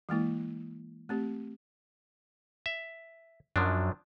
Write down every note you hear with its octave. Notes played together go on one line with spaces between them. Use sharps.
E3 G#3 A#3 E4
A3 C4 G4
E5
F#2 F3 F#3 D4